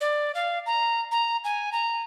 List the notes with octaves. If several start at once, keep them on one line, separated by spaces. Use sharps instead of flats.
D5
F5
A#5
A#5
G#5
A#5